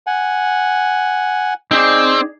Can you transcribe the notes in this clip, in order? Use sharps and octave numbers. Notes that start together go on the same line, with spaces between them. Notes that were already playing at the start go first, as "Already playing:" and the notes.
F#5 G#5
C4 D#4 G#4 D5